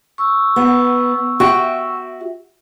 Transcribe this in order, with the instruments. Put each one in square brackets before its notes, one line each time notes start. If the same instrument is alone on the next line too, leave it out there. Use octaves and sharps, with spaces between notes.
[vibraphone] C#6 E6
[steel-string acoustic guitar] B3
F#4 E5 G5